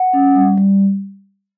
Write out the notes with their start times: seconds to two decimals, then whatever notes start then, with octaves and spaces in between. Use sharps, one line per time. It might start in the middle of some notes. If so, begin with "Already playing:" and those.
Already playing: F#5
0.13 C#4
0.35 G3
0.58 G3